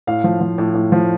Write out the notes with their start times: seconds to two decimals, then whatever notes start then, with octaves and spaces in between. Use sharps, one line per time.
0.07 A2 F5
0.24 F3
0.41 F3
0.58 A2
0.74 A2
0.92 F3